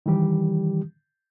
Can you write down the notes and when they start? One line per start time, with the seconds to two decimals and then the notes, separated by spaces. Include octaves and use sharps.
0.06 D#3 E3 G3 G4